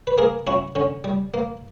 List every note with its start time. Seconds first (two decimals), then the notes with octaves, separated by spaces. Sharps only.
0.07 B4
0.18 A#3 G#4 A#4
0.47 C#4 E4 F#4
0.75 D3 C#4
1.04 G3
1.34 A#3